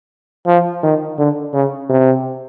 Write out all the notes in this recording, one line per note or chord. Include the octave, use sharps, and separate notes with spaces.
F3
D#3
D3
C#3
C3